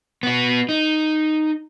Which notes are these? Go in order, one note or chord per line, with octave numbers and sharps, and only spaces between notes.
B3 F#4
D#4